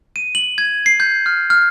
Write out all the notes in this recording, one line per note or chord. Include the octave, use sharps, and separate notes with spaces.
D#7
F#7
G#6
C7
G6
F6
F6